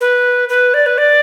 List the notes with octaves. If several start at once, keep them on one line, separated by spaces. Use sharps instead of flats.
B4
B4
D5
B4
D5